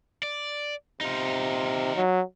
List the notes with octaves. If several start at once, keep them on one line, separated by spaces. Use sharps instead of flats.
D5
C3 D#4 F4
F#3